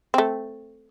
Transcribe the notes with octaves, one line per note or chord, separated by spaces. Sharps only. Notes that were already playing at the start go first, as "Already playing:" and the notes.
A3 C4